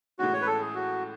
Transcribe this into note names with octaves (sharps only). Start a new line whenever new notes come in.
A2 E3 G#3 C#4 F#4
C#5
B4
A4
G#4
F#4